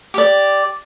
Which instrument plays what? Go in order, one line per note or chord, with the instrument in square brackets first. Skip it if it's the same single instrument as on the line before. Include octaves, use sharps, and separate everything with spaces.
[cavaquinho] G4 D5